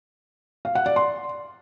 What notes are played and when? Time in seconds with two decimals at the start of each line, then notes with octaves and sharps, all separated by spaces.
0.65 F5
0.75 F#5
0.86 D5
0.96 C6